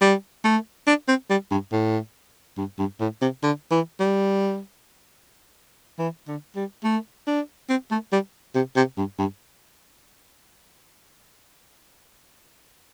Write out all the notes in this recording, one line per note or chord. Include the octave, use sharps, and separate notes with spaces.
G3
A3
D4
C4
G3
G2
A2
G2
G2
A2
C3
D3
E3
G3
E3
D3
G3
A3
D4
C4
A3
G3
C3
C3
G2
G2